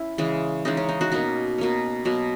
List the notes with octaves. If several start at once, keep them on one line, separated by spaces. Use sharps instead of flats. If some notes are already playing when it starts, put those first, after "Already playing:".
Already playing: C#4 E4
C#3 E3 G#3
C#3 E3 G#3 D#4
C#4
D#4
D#4 F#4
B2 A#3 C#4 D#4
B2 A#3 C#4
B2 F#3 A#3